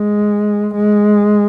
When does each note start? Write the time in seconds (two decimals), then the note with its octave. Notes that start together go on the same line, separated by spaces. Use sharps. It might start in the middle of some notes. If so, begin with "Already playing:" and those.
Already playing: G#3
0.75 G#3